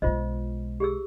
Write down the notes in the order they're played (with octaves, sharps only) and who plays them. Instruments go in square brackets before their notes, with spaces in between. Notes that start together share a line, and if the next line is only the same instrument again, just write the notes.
[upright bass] B1 G#3 [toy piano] F4 C5 D#5
[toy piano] G4 G#4 E6